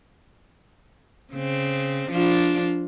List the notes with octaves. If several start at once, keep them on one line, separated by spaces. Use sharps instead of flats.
C#3 C4
F3 D4 F4